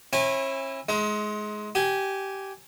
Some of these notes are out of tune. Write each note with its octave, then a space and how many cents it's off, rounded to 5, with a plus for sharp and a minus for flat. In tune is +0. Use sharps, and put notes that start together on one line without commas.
C#4 -40 E4 +0 G#5 -30
G#3 +20 D#4 +40
G4 -15 G#5 +0